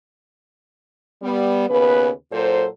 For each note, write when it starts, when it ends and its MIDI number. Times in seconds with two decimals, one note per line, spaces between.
1.23 1.67 55
1.23 1.67 59
1.69 2.11 39
1.69 2.11 49
1.69 2.11 59
1.69 2.11 71
2.32 2.67 46
2.32 2.67 54
2.32 2.67 69
2.32 2.67 72